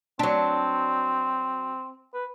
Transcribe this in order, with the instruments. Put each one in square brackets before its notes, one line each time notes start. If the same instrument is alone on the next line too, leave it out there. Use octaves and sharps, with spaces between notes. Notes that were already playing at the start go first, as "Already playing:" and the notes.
[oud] F#3 D4 [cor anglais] C4
[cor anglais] B4